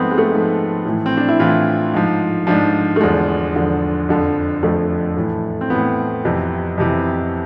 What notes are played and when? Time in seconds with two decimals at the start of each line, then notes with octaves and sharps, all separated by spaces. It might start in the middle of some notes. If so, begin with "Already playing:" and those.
Already playing: G#2 F3 A3 B3 C4
0.11 G#3
0.18 A3
0.31 G#2 F3
0.85 A2 E3
1.06 C4
1.17 D4
1.28 E4
1.39 A2 E3 F4
1.94 G#2 F3
2.47 G#2 F3 D4
2.96 A3
3.01 E2 D3 F3 G#3
3.56 E2 D3 F3
4.09 F2 D3 F3
4.63 F2 D3 F3 A3
5.16 A2 E3
5.61 C4
5.70 A2 E3 B3
6.24 F2 C3 E3
6.78 F2 C3 E3